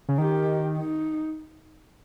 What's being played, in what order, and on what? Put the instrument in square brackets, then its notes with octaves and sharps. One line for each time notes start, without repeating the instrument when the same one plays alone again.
[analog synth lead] C#3
[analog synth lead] D#3 [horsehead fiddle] G4
[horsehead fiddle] D#4